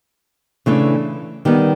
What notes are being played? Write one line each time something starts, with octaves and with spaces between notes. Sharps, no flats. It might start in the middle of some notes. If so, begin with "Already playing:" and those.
C#3 E3 A3 D4
D#3 G3 B3